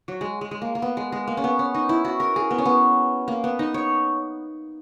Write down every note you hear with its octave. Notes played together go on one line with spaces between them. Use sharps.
F#3
G#3
G#3
G#3
A#3
A#3
B3
G#3
G#3
A#3
C#4
B3
C#4
D#4
E4
F#4
A#4
G#4
B3
C#4
B3
A#3
B3
D#4
C#5